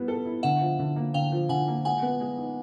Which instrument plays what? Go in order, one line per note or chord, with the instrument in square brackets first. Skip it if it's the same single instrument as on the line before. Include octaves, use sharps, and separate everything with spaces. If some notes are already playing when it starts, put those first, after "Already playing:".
Already playing: [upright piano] G3 B3 E4
A4
E4
[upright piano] D3 [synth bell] E5 F#5
[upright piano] F3
D3
A#3
[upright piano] D3 [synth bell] F5 G5
[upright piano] F3
[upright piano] D3 [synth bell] F#5 G#5
[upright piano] A#3
[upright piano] G#3 [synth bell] F#5 G#5
[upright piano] B3
G#3
D#4